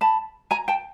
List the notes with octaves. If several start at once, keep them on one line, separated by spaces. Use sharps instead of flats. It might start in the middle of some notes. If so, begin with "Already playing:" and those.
A5 B5
G#5 A#5
G5 A5